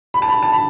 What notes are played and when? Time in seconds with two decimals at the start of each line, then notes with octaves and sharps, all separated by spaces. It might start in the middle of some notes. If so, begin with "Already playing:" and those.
0.14 B5
0.22 A5
0.28 B5
0.43 A5
0.52 B5